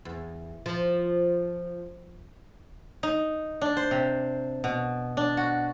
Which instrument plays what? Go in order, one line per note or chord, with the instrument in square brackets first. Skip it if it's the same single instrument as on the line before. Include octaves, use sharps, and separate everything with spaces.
[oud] E2
F3
[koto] D#4
D4
C5
C3
B2
D4
F#4